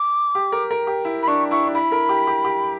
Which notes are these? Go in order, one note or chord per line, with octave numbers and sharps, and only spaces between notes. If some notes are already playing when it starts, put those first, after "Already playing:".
Already playing: D6
G4
A#4
A#4
G4
E4
B5
D4 C#6
E4 C#6
D4
E4 B5
A#4
G4
G4
G4